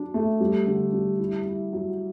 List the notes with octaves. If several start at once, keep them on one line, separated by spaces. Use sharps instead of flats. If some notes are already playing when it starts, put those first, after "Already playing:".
Already playing: F#3 D4
A3
G3
D3
G3
E4
E4
F#3